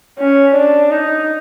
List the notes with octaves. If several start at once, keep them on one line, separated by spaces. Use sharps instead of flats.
C#4
D4
D#4